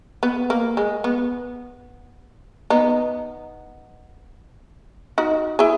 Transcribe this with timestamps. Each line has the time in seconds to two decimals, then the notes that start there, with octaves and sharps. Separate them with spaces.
0.23 B3
0.50 A#3
0.77 G#3
1.04 B3
2.70 B3 D#4
5.18 D#4 F#4
5.59 E4 G#4